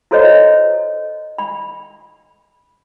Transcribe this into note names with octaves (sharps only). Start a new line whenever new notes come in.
E4 F#4 A4 C5 C#5 D#5
B5